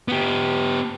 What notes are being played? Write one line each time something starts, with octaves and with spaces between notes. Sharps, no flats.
B3 G4